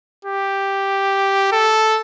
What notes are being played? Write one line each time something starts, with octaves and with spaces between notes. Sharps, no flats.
G4
A4